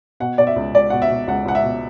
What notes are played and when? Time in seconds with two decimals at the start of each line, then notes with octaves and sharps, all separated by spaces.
0.20 B2 F#5
0.38 B2 D5
0.47 E5
0.56 C#2
0.74 C#2 D5
0.90 B2 F#5
1.02 E5
1.10 B2
1.27 C#2 F#5
1.45 C#2 F#5
1.55 E5
1.64 B2